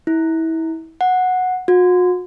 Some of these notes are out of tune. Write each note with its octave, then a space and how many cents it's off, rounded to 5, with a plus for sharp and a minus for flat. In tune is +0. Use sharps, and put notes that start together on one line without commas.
E4 -30
F#5 -10
F#4 -40